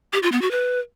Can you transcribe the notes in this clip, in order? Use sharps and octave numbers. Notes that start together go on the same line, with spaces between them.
G4
F4
B3
F#4
B4